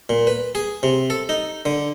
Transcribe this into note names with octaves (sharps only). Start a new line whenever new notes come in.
A#2
B4
G#4
C3
A4
D#4
D3